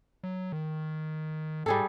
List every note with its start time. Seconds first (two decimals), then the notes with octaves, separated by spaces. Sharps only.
0.24 F#3
0.52 D#3
1.66 G#2 G3 G#4 A4